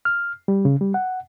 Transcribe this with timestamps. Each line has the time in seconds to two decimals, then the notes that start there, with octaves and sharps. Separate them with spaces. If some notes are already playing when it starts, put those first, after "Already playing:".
0.05 F6
0.48 G3
0.65 C#3
0.81 G3
0.94 F#5